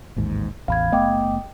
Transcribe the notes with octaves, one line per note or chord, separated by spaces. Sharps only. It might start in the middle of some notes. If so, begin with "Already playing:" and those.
A1 D#2 G#2
A1 E2 F5 B5 G#6
F#1 A3 B3 D#5 G5 D6